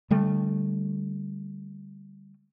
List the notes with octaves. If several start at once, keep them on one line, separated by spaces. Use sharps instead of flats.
D3 G3 A3